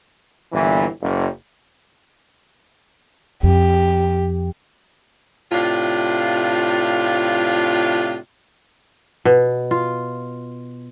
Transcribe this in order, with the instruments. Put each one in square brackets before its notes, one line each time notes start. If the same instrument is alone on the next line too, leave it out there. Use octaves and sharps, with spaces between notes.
[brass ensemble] G1 A#2 E3
F#1
[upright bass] F2 [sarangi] G4
[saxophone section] A2 C3 D4 F4
[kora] B2
F4